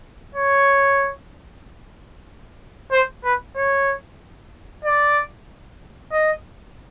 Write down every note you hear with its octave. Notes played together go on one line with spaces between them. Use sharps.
C#5
C5
B4
C#5
D5
D#5